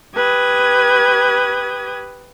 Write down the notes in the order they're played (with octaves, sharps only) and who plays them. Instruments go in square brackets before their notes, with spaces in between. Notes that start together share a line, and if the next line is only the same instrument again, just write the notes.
[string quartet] G4 B4 D#6 G#6